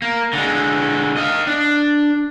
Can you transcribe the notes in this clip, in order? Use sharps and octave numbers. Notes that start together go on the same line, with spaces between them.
A#3
D3 G#3
D#5 F5
D4